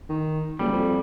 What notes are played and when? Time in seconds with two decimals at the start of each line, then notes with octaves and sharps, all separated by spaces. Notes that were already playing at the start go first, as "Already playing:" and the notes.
0.09 D#3
0.59 F#1 G3
0.73 F2